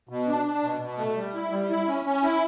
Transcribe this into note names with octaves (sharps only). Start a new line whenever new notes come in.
B2
D4
D4
B2
B2
A3
G3
E4
G3
E4
C#4
C#4
E4